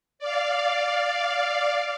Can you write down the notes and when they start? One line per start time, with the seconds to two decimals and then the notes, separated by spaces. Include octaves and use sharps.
0.19 D5 F5